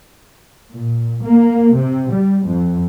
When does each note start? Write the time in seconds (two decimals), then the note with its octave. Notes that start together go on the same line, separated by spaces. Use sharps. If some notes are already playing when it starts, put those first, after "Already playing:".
0.73 A#2
1.23 A#3
1.75 C3
2.12 G3
2.46 F2